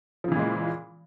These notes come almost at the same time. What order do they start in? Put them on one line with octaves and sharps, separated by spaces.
F3 C#3 E3 A#2 G#3